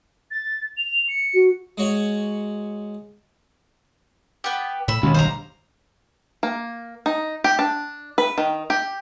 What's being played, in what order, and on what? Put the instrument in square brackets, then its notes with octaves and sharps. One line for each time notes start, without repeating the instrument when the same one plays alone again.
[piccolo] A6
F7
C#7
[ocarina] F#4
[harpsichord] G#3 F#4 C#5 F#5
[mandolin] B3 G4
[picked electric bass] A2 [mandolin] B5 E6
[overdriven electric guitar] D#2 [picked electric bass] B2 G#3 C#4
[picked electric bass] F#1 B1 G2 [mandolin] C5 A#5
[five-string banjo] A#3
D#4
G4
D4
B4
D#3
G4